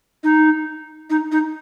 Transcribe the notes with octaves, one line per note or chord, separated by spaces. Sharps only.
D#4
D#4
D#4